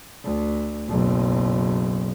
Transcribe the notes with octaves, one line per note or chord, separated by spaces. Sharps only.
D2
F#1 B1